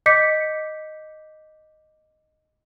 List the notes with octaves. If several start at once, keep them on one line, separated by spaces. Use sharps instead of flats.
D#5 D6 G6 B6 C#7